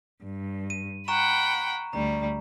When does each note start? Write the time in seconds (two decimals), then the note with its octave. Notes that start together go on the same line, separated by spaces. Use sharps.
0.24 G2
0.70 D#7
1.08 F#5 G5 A#5 B5 C#6 E7
1.93 D2 G3 A#5